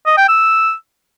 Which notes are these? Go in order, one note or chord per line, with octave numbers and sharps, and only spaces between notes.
D#5
G5
E6